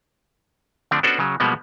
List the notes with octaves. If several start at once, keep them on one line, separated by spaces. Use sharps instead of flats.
D3 F3 A3 C4 D4
B3 C#4 D4 F#4 A4 C5
C#3 F#3
B2 F3 G3 G#3 A#3 B3